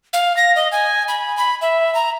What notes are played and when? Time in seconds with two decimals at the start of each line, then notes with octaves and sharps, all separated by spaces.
0.13 F5
0.37 A#6
0.55 D#5
0.72 G#5
1.08 B5
1.37 B5
1.61 E5
1.94 A#5